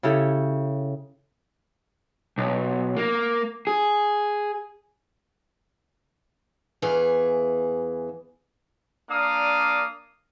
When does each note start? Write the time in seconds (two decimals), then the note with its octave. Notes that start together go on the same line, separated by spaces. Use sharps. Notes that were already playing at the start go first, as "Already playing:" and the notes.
0.03 C#3 E4 G4 A4
2.38 B1
2.97 A#3
3.67 G#4
6.82 E2 E3 G#4 F5
9.10 A#3 D4 A#4 D5 F5 D#6